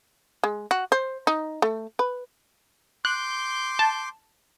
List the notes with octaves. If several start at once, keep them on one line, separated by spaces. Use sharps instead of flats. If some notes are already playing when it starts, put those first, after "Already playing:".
G#3
F#4
C5
D#4
A3
B4
C6 D6 F#6 G6
A5